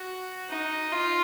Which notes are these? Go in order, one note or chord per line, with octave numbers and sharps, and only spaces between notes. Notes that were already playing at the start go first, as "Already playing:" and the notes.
Already playing: F#4
D#4
F4